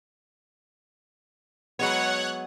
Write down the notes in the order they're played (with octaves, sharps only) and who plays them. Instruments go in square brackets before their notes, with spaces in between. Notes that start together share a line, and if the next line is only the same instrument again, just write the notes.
[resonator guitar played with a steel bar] F#3 G#3 B3 [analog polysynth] C#5 F#5